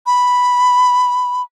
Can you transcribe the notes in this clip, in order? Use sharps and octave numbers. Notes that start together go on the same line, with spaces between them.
B5